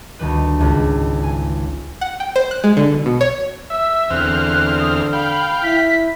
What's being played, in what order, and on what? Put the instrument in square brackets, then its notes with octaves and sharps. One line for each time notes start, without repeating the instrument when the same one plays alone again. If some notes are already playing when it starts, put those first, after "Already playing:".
[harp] D2 D#3 G3 B4
G#1 C#2
G#5
[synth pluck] F#5
G5
C5
F#6
G#3
D3
B1
B2
C#5
[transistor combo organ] E5 [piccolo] E6
[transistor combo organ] E2 C4 F6 [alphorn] D3 [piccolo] F#6
[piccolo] D#6
[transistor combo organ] F5 G5 [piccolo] B5
[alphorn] E4 [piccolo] B6